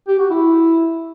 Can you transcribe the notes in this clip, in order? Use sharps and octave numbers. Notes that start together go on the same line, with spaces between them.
G4
F#4
E4